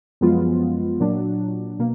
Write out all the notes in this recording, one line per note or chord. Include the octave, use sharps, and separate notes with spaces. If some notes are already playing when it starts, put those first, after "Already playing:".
F#2 F3 G#3 B3 F4
A#2 F#3 D4
B2 A#3